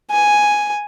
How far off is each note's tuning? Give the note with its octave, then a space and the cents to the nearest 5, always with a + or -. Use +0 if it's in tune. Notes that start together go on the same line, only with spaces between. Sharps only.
G#5 +0